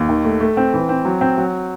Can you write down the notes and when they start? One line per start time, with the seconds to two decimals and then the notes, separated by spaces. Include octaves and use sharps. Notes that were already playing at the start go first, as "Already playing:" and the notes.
Already playing: D#2
0.09 D#3
0.25 A3
0.41 A3
0.57 C4
0.73 E3
0.89 C4
1.05 F#3
1.21 C4
1.38 F#3